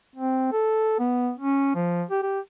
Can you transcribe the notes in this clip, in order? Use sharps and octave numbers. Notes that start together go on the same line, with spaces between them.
C4
A4
B3
C#4
F3
G4
G4